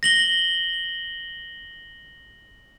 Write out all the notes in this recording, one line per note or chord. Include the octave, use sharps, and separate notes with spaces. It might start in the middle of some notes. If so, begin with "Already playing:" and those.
A#6 F#7 G7